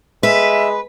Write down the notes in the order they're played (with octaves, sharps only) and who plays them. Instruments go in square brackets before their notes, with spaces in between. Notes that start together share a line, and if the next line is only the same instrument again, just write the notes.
[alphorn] G#3 [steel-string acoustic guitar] B4 [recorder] E5